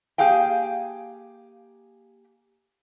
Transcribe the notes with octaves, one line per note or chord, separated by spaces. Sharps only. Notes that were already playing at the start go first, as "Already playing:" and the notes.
A#3 G4 G#4 F5 G5